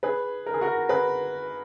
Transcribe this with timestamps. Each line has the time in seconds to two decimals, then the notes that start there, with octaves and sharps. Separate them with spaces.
0.03 G#4 B4
0.46 A#4
0.54 G#4
0.61 F#4 A#4
0.89 G#4 B4